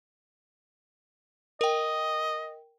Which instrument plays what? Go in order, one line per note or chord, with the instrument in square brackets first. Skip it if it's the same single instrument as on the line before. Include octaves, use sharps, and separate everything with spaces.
[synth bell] A#4 G5 [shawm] D#5